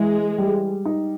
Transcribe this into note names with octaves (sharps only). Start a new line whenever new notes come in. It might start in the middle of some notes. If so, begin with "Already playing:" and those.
Already playing: E3 G#3
G3
D#4